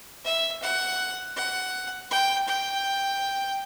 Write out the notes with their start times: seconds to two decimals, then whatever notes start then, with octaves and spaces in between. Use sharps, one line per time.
0.25 E5
0.63 F#5
1.36 F#5
2.11 G5
2.48 G5